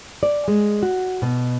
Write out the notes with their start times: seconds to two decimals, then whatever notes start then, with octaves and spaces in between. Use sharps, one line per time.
0.23 D5
0.48 G#3
0.83 F#4
1.22 B2